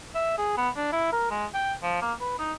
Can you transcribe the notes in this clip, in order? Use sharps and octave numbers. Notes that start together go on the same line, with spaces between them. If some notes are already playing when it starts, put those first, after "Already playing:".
E5
G#4
B3
D4
E4
A#4
G#3
G5
F3
A#3
B4
D#4